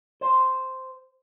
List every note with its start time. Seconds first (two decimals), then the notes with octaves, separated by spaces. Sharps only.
0.21 C5